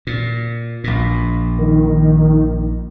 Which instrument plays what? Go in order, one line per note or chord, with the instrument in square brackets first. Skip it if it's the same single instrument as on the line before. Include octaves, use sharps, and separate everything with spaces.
[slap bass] A#2
A#1 A#2
[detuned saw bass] D#3